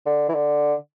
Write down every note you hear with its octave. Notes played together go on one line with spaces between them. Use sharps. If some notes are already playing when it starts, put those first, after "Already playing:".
D3
E3
D3